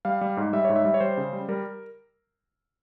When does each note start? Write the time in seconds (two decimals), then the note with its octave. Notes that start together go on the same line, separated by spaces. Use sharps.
0.05 G3 F5
0.21 G3
0.37 G#2
0.53 G3 E5
0.65 G#2 C#5
0.76 E5
0.85 G3
0.94 C#5
1.00 G3 C5
1.17 C#3
1.33 G3
1.49 G3 A#4